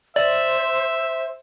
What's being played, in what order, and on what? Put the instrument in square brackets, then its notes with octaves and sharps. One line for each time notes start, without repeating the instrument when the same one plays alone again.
[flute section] C5 [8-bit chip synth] D5 [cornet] E5